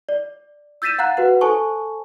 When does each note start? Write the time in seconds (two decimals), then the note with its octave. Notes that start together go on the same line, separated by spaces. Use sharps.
0.09 D5
0.82 E6 G6 A6 B6 D#7 E7
0.98 F5 F#5 A#5 F#6 A6
1.17 F#4 B4 F#5
1.41 A4 C5 G#5 A5 C#6